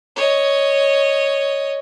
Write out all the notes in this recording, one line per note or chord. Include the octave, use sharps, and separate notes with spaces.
C#5 D#5